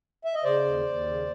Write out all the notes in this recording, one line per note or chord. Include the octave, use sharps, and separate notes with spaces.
E5
D#5
C#3 C5 D5
D#2
D#2
C#3